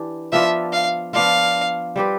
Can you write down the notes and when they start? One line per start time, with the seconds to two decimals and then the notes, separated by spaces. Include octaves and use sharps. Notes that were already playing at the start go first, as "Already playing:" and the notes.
Already playing: E3 D4 G4
0.33 F3 B3 D4 F4 E5
0.73 F5
1.13 F3 B3 D4 F4 F5
1.96 G3 C4 G4 B4